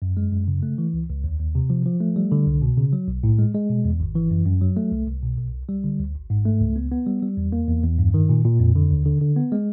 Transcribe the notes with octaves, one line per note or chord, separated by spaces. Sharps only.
F#2
G#3
F#2
C#3
A3
E3
C#2
C#2
D#2
D#2
C3
F3
F3
A3
G3
D3
C2
B2
C#3
F#3
B1
A2
G#3
G#3
B2
E2
G#1
E3
F#2
F#2
F#3
A3
C2
C2
B2
B1
C2
G3
D3
D2
G#1
G#2
A3
C#2
B3
B3
G3
G3
E2
A#3
E2
E2
G2
D#3
A#2
A#2
F2
D3
D#2
D3
D3
B3
G#3